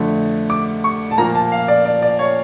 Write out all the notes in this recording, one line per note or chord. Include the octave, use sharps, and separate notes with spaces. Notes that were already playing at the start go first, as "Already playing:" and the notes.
Already playing: F2 D3 A3
D6
C#6
A5
A#2 F3 A#3 A#5
A5
F5
D5
D5
D5
C#5